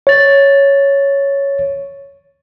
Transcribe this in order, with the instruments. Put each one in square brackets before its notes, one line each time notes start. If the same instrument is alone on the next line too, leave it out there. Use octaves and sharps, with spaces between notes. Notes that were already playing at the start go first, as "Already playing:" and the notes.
[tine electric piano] C#5 A6